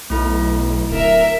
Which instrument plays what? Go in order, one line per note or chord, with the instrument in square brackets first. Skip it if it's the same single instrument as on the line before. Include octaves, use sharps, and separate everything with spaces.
[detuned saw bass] B1 [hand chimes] A3 E4 A4
[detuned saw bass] D1 [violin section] A#4 E5